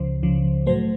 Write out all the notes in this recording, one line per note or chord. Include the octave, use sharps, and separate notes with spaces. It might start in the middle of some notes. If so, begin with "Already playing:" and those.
Already playing: C#2 C#3 F3 C5
C#2 C#3 F3
A2 F#3 A3 C5